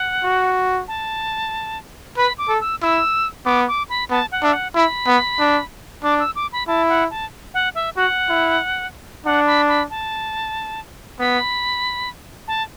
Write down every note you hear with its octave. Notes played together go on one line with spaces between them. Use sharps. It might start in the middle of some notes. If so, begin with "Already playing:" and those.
Already playing: F#5
F#4
A5
B4 B5
D6
A4
E6
E4 E6
B3 D6
D6
B5
B3 A5
F#5
D4 E5
F#5
E4 B5
B3
D4
D4 D6
E6
D6
B5
E4 A5
F#5
A5
F#5
E5
F#4 F#5
E4
D4 F#5
B5
B5
A5
B3 B5
A5